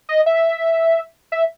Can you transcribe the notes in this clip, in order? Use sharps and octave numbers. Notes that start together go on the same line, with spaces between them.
D#5
E5
E5